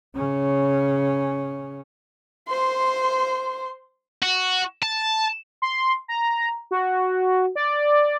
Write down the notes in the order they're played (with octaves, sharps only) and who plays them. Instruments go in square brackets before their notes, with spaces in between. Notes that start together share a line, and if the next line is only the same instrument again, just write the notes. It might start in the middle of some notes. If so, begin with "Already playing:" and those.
[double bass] C#3 C#4
[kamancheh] C5 C6
[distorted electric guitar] F#4
A5
[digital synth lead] C6
A#5
F#4
D5